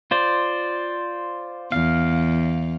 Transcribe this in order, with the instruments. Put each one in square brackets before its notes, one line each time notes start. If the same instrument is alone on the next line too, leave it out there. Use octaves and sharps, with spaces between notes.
[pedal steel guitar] F4 C5 D5
[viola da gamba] E2 [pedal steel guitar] F5